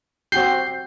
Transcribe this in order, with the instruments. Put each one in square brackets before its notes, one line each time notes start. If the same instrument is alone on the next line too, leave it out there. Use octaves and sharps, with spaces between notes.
[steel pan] C4 F#4 G4 [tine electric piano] G6 C7